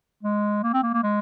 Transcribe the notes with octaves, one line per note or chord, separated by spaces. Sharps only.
G#3
A#3
C4
A#3
A#3
G#3